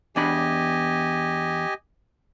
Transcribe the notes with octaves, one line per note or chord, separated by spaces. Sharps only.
E2 D4 G4 D#5 G#5 B5